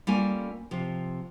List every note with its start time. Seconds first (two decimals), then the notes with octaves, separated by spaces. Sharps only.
0.07 G3 A#3 C#4 F4 A4 G#5
0.71 C3 F3